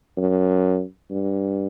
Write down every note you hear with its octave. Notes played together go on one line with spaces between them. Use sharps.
F#2
G2